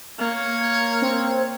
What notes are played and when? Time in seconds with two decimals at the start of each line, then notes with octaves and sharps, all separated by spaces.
0.19 A#3 C#5
1.02 C4